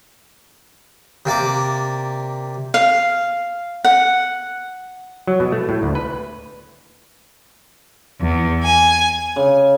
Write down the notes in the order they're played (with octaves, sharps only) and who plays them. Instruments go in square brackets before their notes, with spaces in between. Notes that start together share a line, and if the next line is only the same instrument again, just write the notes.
[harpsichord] C3 A#3 D5 D6
[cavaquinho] F5
F#5
[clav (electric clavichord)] F#3
B2
A3
A2
D2
B4
[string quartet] E2
G#5
[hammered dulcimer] C#3